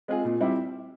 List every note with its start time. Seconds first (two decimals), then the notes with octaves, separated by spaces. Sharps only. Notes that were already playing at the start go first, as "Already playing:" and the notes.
0.08 G#3 C4 F4 G#4
0.25 A#2
0.41 G3 C4 E4 G4